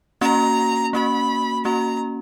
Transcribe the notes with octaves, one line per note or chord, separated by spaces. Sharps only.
A#3 C#4 F#4 A#5
A#3 C#4 F#4 B5
A#3 C#4 F#4 A#5